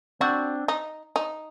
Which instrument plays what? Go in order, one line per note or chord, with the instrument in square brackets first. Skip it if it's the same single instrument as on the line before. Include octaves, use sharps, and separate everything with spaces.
[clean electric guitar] C4 D4 [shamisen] F#4
[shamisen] D#4
D#4